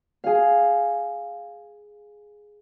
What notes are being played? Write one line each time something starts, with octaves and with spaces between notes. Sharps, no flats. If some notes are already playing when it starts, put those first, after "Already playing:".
G#4 F5